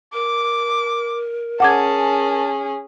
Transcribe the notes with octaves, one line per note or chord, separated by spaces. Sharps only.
A#4 D6
C#4 G#4 F#5 A5 D6 G#6